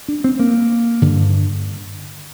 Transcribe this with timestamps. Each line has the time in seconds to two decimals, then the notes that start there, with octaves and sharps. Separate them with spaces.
0.08 D4
0.24 C4
0.39 A#3
1.02 G2 D3